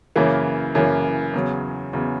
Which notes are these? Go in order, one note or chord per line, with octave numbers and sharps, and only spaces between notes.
F#2 C#3 E3 A#3
F#2 C#3 E3 A#3
E2 C#3 F#3
E2 C#3 F#3